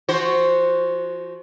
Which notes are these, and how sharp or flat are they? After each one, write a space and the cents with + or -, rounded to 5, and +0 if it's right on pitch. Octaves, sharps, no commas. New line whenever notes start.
F3 -35 F#4 +0 C5 +0